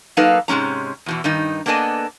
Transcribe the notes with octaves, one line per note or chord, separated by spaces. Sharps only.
F#3 A#3 D#4 A4 B4 F5
G#2 C3 G#3 C#4 A#5
E2 B2 E3
G2 D#3 D#4
A#3 B3 D4 A4 D#5 G#5